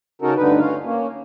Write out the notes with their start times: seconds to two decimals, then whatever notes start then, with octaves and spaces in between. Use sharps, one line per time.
0.22 C#3 C#4 D#4 F#4 A4 A#4
0.37 D2 G2 D3 D#4 B4
0.59 C#4 F4 F5
0.84 A#3 C#4